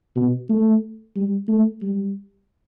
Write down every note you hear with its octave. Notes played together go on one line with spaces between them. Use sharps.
B2
A3
G3
A3
G3